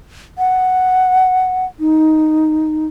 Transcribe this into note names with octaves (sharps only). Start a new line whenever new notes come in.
F#5
D#4